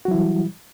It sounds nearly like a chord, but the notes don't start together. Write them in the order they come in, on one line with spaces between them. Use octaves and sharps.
F#4 F#3 E4 E3 G3